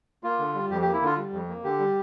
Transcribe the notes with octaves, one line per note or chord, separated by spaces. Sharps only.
A#3 F4
D3
G3
F2 G4
A#3 G4
E4
D3 F4
G3
F2
A#3
D3 G4
G3